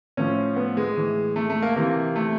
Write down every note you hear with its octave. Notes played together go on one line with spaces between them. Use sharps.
A2 F3 C#4
B3
G#3
A2 E3
A3
A3
A#3
C3 E3 A#3
A3